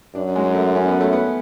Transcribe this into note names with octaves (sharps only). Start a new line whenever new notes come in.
F#2 D4
G#3
A3
C#4
B3
A3
B3